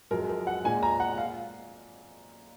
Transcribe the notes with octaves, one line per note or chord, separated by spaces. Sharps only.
F#2 F3 G#3 A#4
A#4
F#5
A#2 G#3 G#5
A#5
F#5
F5